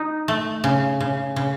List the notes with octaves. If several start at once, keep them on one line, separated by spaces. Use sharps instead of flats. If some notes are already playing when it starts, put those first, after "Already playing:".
Already playing: D#4
A3
C#3
C#3
C#3